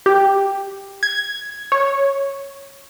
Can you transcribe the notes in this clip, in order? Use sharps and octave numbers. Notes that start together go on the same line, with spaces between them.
G4
G#6
C#5